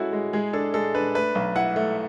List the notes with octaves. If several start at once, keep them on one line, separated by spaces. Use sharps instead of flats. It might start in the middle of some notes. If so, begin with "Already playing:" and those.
Already playing: G#3 C#4 E4 F#4 A4
G#3
G#3 G#4
D4 A4
G#3 A4
D4 B4
A3 B4
B1
E4 F#5
A3